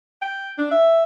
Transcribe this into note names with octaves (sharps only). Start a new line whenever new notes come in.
G5
D4
E5